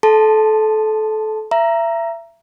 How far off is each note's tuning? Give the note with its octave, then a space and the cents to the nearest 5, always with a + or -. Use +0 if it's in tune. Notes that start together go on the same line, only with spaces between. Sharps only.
A4 -25 A5 +0 C6 +0
E5 +30 A#5 +0